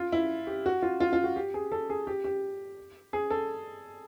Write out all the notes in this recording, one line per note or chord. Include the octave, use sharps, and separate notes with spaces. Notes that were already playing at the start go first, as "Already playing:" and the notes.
Already playing: F4
E4
G4
F#4
F4
F4
F4
F#4
G4
G#4
A4
G#4
G4
G4
G#4
A4